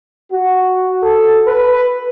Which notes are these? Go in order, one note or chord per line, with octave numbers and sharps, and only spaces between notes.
F#4
A4
B4